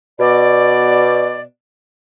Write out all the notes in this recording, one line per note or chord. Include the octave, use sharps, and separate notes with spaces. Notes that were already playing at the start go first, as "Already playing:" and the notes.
B2 D5